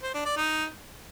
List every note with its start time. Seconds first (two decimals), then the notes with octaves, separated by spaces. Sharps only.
0.03 C5
0.14 D4
0.25 D5
0.37 D#4